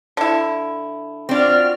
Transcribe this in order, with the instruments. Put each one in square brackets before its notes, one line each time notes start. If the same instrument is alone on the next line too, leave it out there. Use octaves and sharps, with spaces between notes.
[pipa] D3 E4
[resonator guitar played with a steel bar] C4 D4 [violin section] F4 F#4 F6